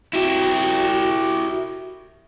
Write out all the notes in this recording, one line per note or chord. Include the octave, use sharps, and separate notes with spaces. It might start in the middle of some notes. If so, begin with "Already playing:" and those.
E4 F#4 G4